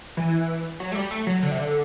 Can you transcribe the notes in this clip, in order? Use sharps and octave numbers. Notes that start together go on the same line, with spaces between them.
E3
F#3
A3
G3
A3
F#3
D3
C3
D3